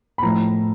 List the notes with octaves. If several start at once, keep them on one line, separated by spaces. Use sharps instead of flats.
B5
A2 F3 A#5